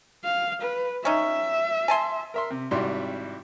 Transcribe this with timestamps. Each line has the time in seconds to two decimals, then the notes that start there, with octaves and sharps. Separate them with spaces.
0.24 F5
0.62 B4
1.05 C#4 D#4 E5
1.88 G#5 A5 C6
2.34 A#4 E5 C6
2.50 C3
2.71 G#1 C3 G3 E4 F#4 C6